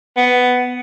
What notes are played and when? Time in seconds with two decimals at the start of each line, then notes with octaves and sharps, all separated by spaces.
0.17 B3